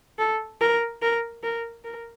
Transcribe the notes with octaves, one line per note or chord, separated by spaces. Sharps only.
A4
A#4
A#4
A#4
A#4